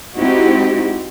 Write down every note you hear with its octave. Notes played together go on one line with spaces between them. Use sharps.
G#3 C4 D#4 E4 F#4 G4